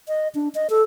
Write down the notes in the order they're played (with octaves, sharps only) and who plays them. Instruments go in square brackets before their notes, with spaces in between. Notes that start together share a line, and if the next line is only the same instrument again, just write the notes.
[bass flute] D#5
D4
D#5
A4